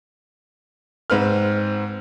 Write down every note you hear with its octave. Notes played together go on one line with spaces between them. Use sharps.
G#2 C4 B4 F6